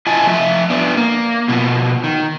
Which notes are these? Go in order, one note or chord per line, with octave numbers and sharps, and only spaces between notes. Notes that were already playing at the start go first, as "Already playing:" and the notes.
E4 F4 D#5 G#5 A5
F3 A3 E5
B3 D4
A#3
B2 D#3 F3
D#3